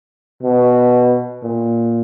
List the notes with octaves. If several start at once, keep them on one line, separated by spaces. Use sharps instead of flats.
B2
A#2